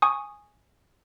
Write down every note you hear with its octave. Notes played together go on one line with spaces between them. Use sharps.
G#5 C#6 D#6